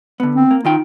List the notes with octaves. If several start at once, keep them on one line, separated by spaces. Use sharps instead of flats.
D3 B3
C4
A#3
D#3 D#4 F4 G5